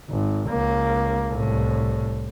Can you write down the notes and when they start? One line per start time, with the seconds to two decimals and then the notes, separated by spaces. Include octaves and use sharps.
0.10 G#1
0.50 C#2 A#3
1.32 C2 A2